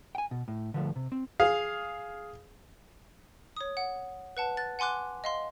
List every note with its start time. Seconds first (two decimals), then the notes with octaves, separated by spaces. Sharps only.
0.15 G5 G#5
0.31 B2
0.48 A2
0.74 D3 F3 A3
0.96 C3
1.12 C4
1.40 G#4 F5
3.56 C#5 D#6
3.77 F#5
4.37 B4 F#5 A5
4.57 F#6 A6
4.79 F#5 G#5 C6 D6 F#6
5.24 D#5 F5 C6